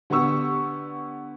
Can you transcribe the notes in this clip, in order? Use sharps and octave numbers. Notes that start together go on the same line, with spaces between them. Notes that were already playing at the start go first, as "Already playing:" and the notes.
D3 B3 G4 C#6 E6